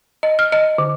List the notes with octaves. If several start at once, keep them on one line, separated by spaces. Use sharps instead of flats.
D#5
F6
D#5
D3